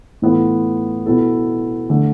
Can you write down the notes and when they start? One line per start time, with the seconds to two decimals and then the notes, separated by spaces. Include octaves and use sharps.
0.22 A2 E3 B3 F4 A4
1.06 B2 B3 E4 A4
1.90 D3 A3